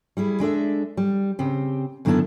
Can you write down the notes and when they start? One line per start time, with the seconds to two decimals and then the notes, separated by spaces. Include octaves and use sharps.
0.17 G3 E4 G#4
0.40 G#3 D4 A4 E5
0.97 G3
1.39 C#3 C4 G4
2.05 F#2 D3 D#3 B3 E4 A5